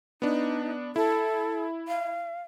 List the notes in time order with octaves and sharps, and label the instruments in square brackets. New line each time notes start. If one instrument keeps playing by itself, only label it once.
[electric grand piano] B3 D4 [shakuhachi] D#4
[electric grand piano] E4 [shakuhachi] A4
[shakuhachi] F5